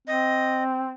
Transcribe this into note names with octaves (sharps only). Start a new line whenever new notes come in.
C4 D#5